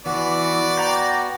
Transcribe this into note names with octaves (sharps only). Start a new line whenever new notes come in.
E3 B3 F#4 D5
G5 A#5